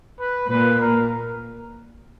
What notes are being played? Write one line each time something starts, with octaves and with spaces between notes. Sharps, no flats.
B4
A#2 B4
A#4